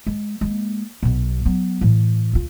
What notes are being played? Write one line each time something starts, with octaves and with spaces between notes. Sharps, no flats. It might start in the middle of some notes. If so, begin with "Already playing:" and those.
G#3
G#3 A#3
B1 B2
F#3 B3
A2 E3
D2 F4